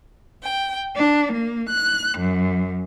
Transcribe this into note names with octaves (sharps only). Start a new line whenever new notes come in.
G5
D4
A#3
F#6
F#2